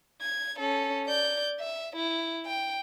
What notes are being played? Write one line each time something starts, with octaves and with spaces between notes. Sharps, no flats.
G#6
C#4 A4
D5 G6
E5
E4
G5